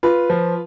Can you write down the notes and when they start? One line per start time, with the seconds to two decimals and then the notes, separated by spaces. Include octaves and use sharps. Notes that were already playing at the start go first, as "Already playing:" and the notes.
0.03 F4 B4
0.30 F3